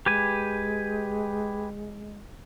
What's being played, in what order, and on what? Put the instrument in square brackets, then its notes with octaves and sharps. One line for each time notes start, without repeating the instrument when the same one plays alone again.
[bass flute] G#3 [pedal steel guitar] G4 B4 G#5